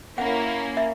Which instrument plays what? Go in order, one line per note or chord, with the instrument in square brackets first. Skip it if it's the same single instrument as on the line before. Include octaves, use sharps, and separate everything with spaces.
[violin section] A#3 C#4 E4 [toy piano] F#5
[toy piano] E5